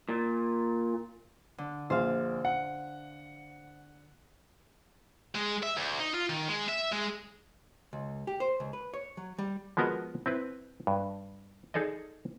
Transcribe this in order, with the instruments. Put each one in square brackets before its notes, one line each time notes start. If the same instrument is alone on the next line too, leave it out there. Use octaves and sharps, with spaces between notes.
[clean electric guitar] A#2
[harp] D3
[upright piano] A#1 [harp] C5 F5
[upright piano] F#5
[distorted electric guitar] G#3
E5
D2
D#4
F4
D#3
G#3
E5
G#3
[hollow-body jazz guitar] C#2
G4
C5
C#2
B4
C#5
F#3
G3
[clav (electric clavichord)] F3 G#3 B3 F#4 A#4 D#5
C4 E4 B4
G2
D#4 G#4 A4 D5 D#5